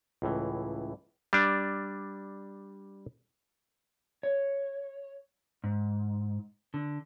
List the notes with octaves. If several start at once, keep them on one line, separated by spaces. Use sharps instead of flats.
C#2 A2 E3
G3 D4
C#5
G#2
D3